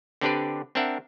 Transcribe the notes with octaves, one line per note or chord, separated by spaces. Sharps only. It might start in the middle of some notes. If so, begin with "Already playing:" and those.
D3 C4 D4 G4 B4 D5
C4 D4 A#4 E5 F#5